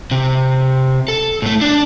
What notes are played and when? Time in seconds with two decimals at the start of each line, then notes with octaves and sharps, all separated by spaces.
0.11 C3
1.08 A4
1.42 A2 A3
1.61 D4 D5